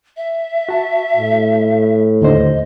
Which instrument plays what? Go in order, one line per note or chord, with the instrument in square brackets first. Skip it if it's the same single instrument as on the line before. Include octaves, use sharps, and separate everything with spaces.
[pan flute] E5
[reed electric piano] F#4 A5
[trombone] A2
[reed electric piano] D#2 D3 C5 [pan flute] D#5